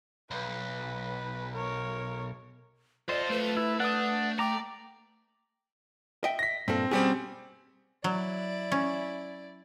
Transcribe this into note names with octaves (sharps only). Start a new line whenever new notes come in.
B1 B4
A#4 C#5
F4 A4 C5 D5 D#5
A3 B4
E4
D4 B4 F#5 D#6
D5 G5 A#5 D6
D#5 E5 G5
A#6 B6
G2 A#2 C4 A4
B2 G3 C4 C#4 G4 G#4
F#3 E4 D5
C#4